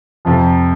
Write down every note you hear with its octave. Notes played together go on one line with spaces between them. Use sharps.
F2 C3 F3